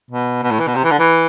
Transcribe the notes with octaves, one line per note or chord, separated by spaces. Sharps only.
B2
B2
A2
E3
B2
C3
E3
D3
E3